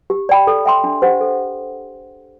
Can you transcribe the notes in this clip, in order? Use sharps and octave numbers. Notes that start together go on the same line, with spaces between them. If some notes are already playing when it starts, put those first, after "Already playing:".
G4
D5 G5 B5
A4
E5 G5 C6
D4
G4 C5 F#5
A4